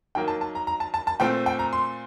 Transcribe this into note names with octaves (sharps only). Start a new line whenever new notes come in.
D#3 F#3 A#3 G5
A5
A5
A#5
A#5
A5
A5
A5
A#2 A3 C4 G5
G5
A#5
C6